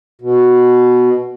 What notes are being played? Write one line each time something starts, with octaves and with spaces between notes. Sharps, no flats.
B2